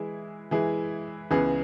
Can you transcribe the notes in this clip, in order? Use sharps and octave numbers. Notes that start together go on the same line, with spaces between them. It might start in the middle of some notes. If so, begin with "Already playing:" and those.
Already playing: E3 G#3 E4 G#4
E3 G#3 E4 G#4
C#2 C#3 E3 B3 G#4